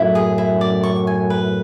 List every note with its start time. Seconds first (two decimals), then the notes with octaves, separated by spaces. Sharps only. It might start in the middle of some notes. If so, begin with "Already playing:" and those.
Already playing: F#2 A2 E4
0.15 G#4
0.38 E4
0.61 D5
0.83 C#6
1.07 G#5
1.30 B4